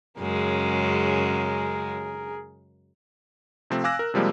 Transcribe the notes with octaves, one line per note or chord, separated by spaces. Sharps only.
F#2 C#3 G#3 G#4 A#4
C3 F3 A3 C4
F5 G#5 D6 E6 F#6 A#6
A#4
C3 F3 G3 G#3 A#3